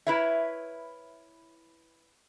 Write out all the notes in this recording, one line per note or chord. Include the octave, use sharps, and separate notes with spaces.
E4 A#4 B4 C#5 E5